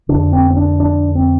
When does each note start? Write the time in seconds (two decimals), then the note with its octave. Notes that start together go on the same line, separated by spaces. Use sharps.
0.09 F2 D3 D4
0.33 C4
0.50 C4
0.57 D4
0.80 D4
1.15 C4